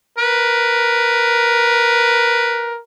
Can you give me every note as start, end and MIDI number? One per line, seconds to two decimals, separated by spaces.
0.18 2.79 70
0.18 2.73 71